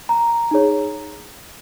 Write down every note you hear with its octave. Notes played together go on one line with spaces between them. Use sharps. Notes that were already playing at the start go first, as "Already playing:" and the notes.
A#5
D#4 G#4 C#5